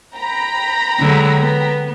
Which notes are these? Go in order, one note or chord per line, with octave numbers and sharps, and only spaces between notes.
G5 A#5 B5
D3 F#3 G#3
B3